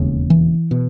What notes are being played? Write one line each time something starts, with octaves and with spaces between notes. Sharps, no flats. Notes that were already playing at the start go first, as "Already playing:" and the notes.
Already playing: E1 D#2 C#3
E3
B2